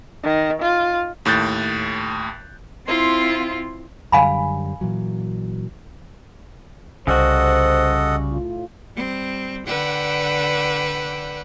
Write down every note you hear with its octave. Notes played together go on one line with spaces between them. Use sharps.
D#3
F4
D#2 A2 F#6 G6 A6
C4 E4 F4 C6
F#2 D3 G3 F5 G#5 B5
A#2 E3 F#3
C2 C#3 G3 F#4 A4 C5 D#5 F#5
A2 F4
G3 C4
D3 B4 D5 F#5 G5 E6